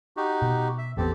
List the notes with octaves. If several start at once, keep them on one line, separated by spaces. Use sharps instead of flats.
D#4 F#4 G4
B2
E5
A1 E2 B3 C4 G4 A4